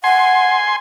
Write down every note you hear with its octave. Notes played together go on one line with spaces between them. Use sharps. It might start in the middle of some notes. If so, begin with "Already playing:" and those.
F#5 G#5 C6